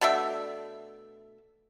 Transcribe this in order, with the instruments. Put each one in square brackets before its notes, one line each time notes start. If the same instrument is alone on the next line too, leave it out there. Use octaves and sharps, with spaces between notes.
[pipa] B2 A3 D4 E5